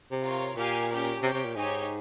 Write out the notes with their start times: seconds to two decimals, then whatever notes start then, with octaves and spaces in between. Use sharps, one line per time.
0.11 C3
0.23 F4 A#4 C#5
0.56 A#2 G4 A#4 F5 G#5
0.89 C#4 G4 A#4
1.23 C3 G4 C#5 G5
1.33 C3
1.45 A#2
1.56 G#2 D#4 G4 C#5 G#5